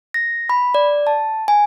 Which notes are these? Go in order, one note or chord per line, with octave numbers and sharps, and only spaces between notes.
A#6
B5
D5
A5
G#5